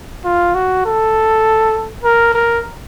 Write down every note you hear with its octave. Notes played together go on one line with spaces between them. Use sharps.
F4
F#4
A4
A#4
A#4